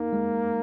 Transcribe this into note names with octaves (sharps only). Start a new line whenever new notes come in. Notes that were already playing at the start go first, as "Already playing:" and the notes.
Already playing: A#3 D#4
G#3